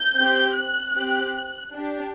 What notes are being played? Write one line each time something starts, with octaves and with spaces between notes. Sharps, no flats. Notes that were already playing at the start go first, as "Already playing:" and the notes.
Already playing: G6
C4 G4
F#6
C4 G4
D4 G4